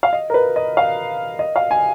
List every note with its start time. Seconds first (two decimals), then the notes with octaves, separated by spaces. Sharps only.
0.03 F5
0.13 D#5
0.30 A#4
0.34 B4
0.56 D#5
0.77 F5
1.39 D#5
1.56 F5
1.71 G#5